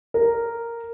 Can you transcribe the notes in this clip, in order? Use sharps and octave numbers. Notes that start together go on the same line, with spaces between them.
A#4